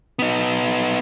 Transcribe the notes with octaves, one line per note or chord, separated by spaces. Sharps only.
B3 D#4